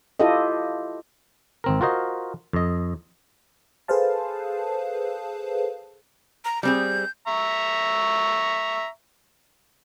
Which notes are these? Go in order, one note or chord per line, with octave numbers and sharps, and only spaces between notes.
E4 F4 G4 A4 D#5
G#1 C4 A#4
F4 F#4 A#4 C5 D#5
F2 D#5
G#4 A4 B4 C5 F5 A5
A#5
G3 C4 G#4 G6
E5 A#5 C#6